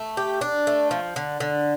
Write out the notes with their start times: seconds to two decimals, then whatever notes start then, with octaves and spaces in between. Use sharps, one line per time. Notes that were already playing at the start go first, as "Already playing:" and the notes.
Already playing: A3
0.17 G4
0.41 D4
0.67 A3
0.91 F3
1.16 D3
1.40 D3